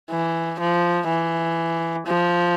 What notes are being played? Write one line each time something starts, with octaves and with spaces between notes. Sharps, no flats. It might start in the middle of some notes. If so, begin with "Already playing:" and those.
E3
F3
E3
F3